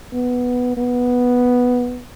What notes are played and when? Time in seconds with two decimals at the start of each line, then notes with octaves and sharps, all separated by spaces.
0.13 B3
0.77 B3